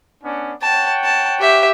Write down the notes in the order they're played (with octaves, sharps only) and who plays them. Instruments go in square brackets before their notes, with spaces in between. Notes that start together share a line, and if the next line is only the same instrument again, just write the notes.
[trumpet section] B3 C#4 D4
[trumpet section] C#5 F#5 G5 [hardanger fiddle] A5
[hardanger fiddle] A5
G4 E5